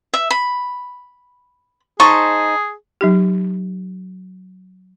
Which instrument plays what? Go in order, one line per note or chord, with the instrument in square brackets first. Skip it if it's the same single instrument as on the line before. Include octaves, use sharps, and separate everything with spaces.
[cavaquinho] E5
B5
[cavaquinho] D#4 C5 A5 [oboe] G#4 [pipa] C#6
[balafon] F#3 D#4 G4